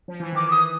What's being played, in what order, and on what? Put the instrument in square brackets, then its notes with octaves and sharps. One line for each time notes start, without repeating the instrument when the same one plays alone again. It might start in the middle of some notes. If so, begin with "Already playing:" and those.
[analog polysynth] F3
E3
[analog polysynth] D#3 [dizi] D6
[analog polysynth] E3
[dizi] D#6